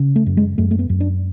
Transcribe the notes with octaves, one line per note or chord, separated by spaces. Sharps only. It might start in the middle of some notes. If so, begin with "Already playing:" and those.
Already playing: C#3
A3
F#2
G#3
F#2 A3
A3
B3
F#2
D4